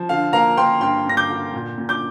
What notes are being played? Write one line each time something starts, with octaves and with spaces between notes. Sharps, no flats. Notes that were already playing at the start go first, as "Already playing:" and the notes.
Already playing: F3
D3 F5
A#3 F5 A#5
A#3 G5 C6
G2 G5 C6
G2 A#6
D6 G6
D3
A#2
A#2
D6 G6